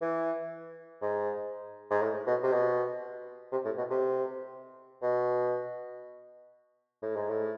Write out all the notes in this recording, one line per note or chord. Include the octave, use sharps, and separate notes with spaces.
E3
G#2
G#2
A2
B2
C3
B2
C3
A2
B2
C3
B2
A2
G#2
A2